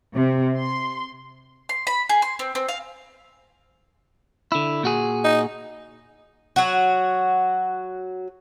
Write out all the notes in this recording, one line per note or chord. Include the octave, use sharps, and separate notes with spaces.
C3
C6
C6
B5
G#4
C6
C4
C4
F5
D3 E4
A#2 F#4 G#4
D#4
F#3 F#4